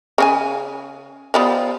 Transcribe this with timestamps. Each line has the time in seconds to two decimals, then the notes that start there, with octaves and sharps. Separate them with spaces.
0.18 C#3 C#4 G#5
1.34 F3 G3 B3